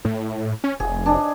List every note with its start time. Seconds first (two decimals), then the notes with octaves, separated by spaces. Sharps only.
0.05 A2
0.64 C#4
0.80 F1 G#4
1.06 D4 G#4 D#5